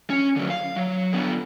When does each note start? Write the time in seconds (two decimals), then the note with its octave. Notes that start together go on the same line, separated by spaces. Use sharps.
0.10 C#4
0.36 D3 F#3
0.50 F5
0.76 F#3
1.13 D3 B3